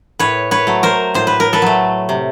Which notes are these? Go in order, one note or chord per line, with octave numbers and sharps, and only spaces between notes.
A2 B4 C#5
B4 C#5
F#3 A3
A#4 C5
A2 C5
B4
A#4
A4 B4
F#3 A3
C3